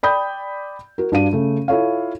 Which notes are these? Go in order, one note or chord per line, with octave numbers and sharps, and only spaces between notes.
D5 G5 B5 D#6 G6
F#4 A#4
G2 D4 F#4 F5 D#7
C#3 A3
E4 F4 A4 C#5 F5